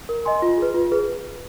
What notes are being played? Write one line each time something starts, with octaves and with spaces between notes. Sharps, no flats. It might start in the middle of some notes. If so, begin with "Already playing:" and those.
A#4
D#5 G#5 C6
F4
G#4 B4
F4
G#4 B4